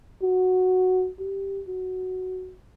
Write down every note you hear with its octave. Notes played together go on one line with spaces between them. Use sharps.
F#4
G4
F#4